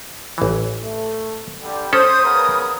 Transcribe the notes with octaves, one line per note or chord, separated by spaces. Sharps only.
A1 E3
A3
D3 G3
C#4 A4 C5 D#6
C#3 B3 A#4